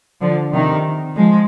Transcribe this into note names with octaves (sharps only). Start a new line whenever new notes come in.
D3 F3
C3 D#3
F3 G#3